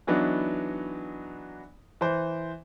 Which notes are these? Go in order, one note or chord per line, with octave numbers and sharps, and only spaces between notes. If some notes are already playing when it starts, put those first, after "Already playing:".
E3 F#3 B3 D4 D#4
E3 C5